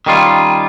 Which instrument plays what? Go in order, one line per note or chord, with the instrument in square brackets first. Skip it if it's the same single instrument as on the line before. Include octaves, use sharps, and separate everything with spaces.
[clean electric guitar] D#3 G3 C#4 F4